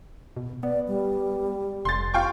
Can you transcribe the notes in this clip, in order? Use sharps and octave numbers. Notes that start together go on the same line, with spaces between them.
B2
B3 D5
G3
F1 C6 A6
F4 F5 G5 C#6